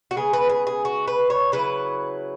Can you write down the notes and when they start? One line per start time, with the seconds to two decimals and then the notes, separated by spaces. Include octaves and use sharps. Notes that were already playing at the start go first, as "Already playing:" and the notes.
0.11 F#4
0.16 C#3 G#3 B3 G#4
0.33 B4
0.50 G#4
0.67 G#4
0.85 F#4
1.07 B4
1.30 C#5
1.52 C#3 F#3 E4 B4